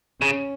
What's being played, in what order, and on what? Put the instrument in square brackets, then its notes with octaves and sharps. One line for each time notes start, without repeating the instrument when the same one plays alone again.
[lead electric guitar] C#3 [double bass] C#4